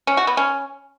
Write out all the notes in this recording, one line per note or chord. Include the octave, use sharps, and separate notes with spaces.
C#4
F#4
B3
C#4